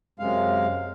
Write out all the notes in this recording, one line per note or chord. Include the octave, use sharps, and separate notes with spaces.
F#2 C3 G#3 F5